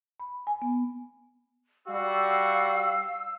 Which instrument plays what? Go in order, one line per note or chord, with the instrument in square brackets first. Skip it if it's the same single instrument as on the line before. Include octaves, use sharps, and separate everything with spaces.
[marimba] B5
G#5
B3
[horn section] G3 F#4 [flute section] F5 E6